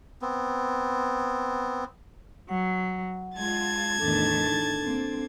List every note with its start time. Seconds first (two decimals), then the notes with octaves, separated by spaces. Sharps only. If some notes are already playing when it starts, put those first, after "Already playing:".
0.21 B3 C4
2.49 F#3 F#5
3.36 G#3 F4 A5 G#6 A6
3.99 E2 A2 D#3 D4 A4
4.82 A#3 C4